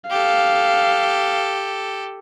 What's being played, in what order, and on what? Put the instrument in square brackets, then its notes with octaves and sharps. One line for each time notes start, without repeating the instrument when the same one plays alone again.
[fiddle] G4 A4 [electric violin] F5